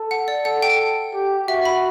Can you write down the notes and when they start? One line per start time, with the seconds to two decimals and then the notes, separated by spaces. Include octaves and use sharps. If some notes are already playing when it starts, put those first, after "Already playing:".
Already playing: A4
0.11 F#5
0.28 D5
0.45 A4 F#5
0.62 G5
1.13 G4
1.47 F#4 E5
1.65 B5